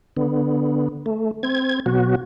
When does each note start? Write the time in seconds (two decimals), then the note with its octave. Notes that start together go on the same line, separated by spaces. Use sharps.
0.17 D3 B3
1.06 A3
1.43 C4 G#6
1.86 B2 F#3 F#4